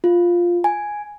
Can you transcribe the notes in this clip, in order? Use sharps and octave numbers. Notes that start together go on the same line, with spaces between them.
F4
G#5